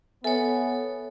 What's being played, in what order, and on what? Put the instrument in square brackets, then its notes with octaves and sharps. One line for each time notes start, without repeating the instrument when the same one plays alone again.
[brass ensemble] B3 [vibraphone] A4 C#5 [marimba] E5 G#5